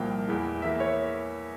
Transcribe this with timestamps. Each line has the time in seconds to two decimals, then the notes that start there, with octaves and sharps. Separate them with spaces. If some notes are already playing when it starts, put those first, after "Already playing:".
Already playing: C2 A#2 F3 A#3 G5
0.27 E2 E3 G#3
0.62 E2 E3 A#3 E5
0.80 C#5